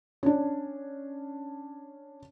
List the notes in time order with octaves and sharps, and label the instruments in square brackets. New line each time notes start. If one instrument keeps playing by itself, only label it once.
[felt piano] C#4 D4